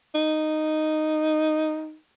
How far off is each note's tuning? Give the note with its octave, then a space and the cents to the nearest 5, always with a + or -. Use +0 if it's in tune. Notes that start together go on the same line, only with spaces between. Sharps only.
D#4 -5